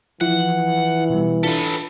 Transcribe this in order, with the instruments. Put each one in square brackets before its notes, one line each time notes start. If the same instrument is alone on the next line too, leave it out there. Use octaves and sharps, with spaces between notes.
[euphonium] E3 [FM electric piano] F3 E4 F4 [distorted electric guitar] F#5
[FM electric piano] B2 G3
[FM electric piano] D4 F4 B6 [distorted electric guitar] A4 B4